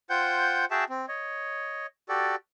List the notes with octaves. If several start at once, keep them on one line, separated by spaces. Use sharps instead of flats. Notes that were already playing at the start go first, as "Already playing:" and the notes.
F4 C5 F#5 G5 G6
F#4 G#4 E5 G5 A5
C4
C#5 D#5
F#4 G4 A4 D5